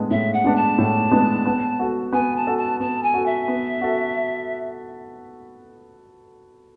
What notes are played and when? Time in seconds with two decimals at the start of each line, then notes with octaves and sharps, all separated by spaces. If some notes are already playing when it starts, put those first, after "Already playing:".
Already playing: A2 G#3 B3 D4
0.10 A2 E5
0.33 F#5
0.44 G#3 B3 D4
0.55 A5
0.78 A2
1.11 G#3 B3 D4
1.45 B3
1.79 F#4 A4
2.12 B3 G#5
2.35 A5
2.47 F#4 A4
2.57 A5
2.80 B3 A5
3.03 G#5
3.14 F#4 A4
3.25 E5
3.48 B3
3.81 F#4 A4